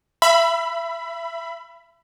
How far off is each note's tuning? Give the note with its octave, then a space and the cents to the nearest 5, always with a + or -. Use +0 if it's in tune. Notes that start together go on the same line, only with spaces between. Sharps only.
E5 +30 B5 +10